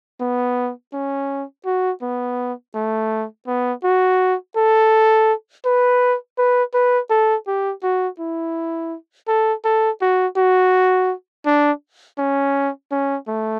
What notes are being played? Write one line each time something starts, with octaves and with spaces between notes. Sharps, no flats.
B3
C#4
F#4
B3
A3
B3
F#4
A4
B4
B4
B4
A4
G4
F#4
E4
A4
A4
F#4
F#4
D4
C#4
C#4
A3